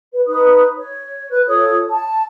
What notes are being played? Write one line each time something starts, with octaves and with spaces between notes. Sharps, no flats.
B4
D#4 B4 D#6
C#5
B4 F#6
F4 A4 C#5 D#6
A5